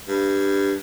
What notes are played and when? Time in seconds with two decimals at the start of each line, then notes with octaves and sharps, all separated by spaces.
0.07 G2